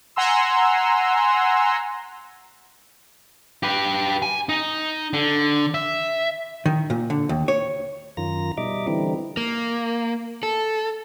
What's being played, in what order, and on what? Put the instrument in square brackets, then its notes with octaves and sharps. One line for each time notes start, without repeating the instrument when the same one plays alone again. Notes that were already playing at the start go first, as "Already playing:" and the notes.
[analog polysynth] F#5 G#5 A#5 C6 E6
[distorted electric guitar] G4 B4
G#5
D#4
D3
E5
[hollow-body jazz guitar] D#3
A#2
D3
D#2
C#5
[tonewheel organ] F#2 D#3 F4 A#5 A#6
B2 G3 D#4 D#5 E5 D6
D3 E3 G3 C4 D#4 E4
[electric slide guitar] A#3
A4